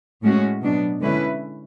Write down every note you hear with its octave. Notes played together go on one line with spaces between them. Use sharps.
A2 G#3 C#4 F#4
B2 F#3 B3 D4
D3 G#3 C#4 E4 B4